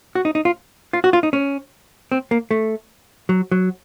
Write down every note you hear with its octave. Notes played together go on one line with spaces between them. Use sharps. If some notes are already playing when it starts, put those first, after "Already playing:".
F#4
D#4
D#4
F4
F4
F#4
F4
D#4
C#4
C4
A#3
A3
F#3
F#3